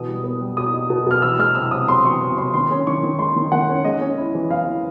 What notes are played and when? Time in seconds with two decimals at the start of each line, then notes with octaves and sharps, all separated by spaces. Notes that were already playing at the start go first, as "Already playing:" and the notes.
Already playing: B2 E3 D#6
0.08 G3
0.24 B3
0.41 G3
0.57 B2 D#6
0.74 D#4
0.90 B2
1.07 B2 F6
1.22 E3 E6
1.39 G#3 F6
1.55 C3 E6
1.71 C3 D#6
1.88 C3 C6
2.05 E3 C#6
2.21 C3
2.37 C3 C6
2.54 D#3 C6
2.71 C#4
2.87 D#3 C#6
3.03 D#3
3.19 G#3 C6
3.36 D#3
3.52 D#3 F#5
3.69 C#4
3.84 G#3 D#5
4.01 C#4
4.18 E4
4.35 E3
4.51 E3 F5
4.66 E3